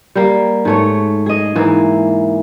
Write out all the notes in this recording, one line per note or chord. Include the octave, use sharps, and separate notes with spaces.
G3 A#3
G#2 A3 C#5
G#4 D#5
G#2 E3 A#3